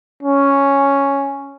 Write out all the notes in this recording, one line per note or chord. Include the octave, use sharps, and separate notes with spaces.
C#4